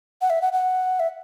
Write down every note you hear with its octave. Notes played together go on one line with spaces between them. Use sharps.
F#5
E5
F#5
F#5
E5